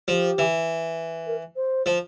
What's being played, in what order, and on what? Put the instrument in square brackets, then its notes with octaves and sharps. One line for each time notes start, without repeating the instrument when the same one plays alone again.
[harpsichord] F3 [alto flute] G4
[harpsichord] E3
[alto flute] A#4
C5
[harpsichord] F3